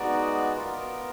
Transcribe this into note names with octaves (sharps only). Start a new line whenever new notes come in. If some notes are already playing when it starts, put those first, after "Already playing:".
Already playing: G#3 B3 D#4 F#4 D5
B3 F4 A#4